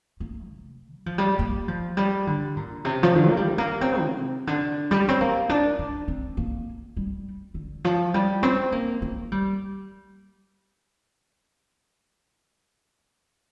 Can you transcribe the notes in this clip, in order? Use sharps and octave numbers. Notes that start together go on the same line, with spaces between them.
A#3
C3
G3
F3
G3
A#3
F3
G3
D3
A#2
C3
F3
D3
A#3
G3
A#3
C4
C3
D3
G3
C4
A#3
D4
D4
C4
A#3
G3
D3
F3
G3
C4
A#3
A#3
G3